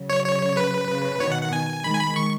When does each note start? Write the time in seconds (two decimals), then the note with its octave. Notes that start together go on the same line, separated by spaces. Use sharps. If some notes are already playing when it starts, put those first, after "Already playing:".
Already playing: C#3 F#3
0.10 C#5
0.25 C#5
0.57 B4
0.89 C#3
1.20 B2 D#3 C#5
1.32 F#5
1.42 F#5
1.53 G#5
1.84 D#3 G#3 B5
1.93 G#5
2.00 B5
2.16 C#6